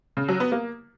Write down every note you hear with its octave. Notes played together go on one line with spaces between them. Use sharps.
C#3
F#3
B3
A#3